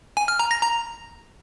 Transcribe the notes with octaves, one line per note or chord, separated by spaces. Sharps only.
G#5
F6
A#5
A#6
A#5